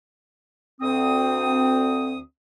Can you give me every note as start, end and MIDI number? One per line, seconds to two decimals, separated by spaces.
0.81 2.19 38
0.81 2.19 60
0.81 2.19 87